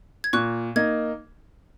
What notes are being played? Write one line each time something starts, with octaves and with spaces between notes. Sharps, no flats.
G#6
A#2 C#6 F#6
A#3 D#4 G#6